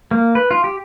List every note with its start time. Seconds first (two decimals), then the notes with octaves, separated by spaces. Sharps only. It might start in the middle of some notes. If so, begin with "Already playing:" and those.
0.11 A#3
0.35 B4
0.51 F4
0.64 G4